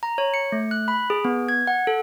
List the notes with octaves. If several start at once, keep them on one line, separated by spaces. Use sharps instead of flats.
A#5
C#5
C#7
A3
F#6
B5
G#4
B3
G#6
F#5
A4